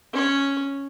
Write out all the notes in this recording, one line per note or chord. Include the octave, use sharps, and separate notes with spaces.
C#4 C#5